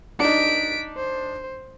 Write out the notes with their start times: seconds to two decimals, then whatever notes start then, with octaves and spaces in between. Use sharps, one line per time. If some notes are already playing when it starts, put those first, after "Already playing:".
0.20 D4 D#4 B6 D7
0.97 C5